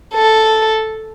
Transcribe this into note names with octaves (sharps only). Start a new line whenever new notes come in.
A4